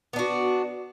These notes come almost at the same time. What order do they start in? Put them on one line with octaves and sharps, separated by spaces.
B3 D4 F#4